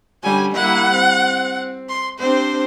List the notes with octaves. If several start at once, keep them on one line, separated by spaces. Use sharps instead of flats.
D3 G3 C#4 G#5
G3 A#3 E4 F#5
C4
C6
C4 D4 G4 C5